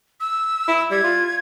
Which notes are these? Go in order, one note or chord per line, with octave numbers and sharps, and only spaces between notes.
E6
E4
G3 G#6
F4